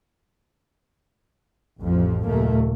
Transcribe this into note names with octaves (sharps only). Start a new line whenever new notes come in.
A1 F2 F3
F#1 D#2 A#2 A3 A#3